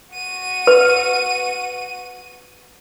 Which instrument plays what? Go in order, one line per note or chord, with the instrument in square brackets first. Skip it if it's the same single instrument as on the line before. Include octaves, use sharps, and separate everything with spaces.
[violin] F#4 D#7
[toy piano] B4